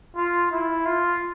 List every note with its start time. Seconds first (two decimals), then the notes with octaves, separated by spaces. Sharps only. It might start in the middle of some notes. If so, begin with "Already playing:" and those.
0.16 F4
0.51 E4
0.86 F4